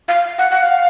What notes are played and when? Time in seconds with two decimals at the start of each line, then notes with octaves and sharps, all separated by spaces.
0.08 F5
0.38 F#5
0.51 F#5
0.63 F5